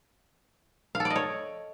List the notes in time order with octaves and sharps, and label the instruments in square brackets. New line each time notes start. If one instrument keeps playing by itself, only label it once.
[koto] F5
A4
D5
D#5
C#5